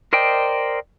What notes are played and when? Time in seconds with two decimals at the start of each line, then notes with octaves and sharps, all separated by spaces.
0.13 A#4 C5 D5 D#5 G5